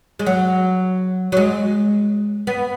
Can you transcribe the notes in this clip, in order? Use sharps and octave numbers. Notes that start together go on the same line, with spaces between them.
G#3
F#3
F#3
G#3
B3